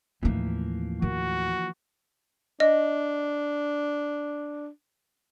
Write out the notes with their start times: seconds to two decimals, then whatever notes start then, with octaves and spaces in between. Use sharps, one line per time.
0.23 D#2 A2 E3 F3 A3 A#3 C4 D#4
1.02 D#3 F#4
2.60 D4 D#5